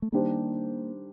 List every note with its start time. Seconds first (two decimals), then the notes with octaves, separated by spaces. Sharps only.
0.02 A3
0.12 D#3 G3 A#3 D4 G4 C5